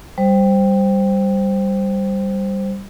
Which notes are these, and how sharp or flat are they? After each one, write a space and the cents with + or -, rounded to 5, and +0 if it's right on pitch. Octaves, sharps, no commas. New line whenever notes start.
G3 +0 C5 +0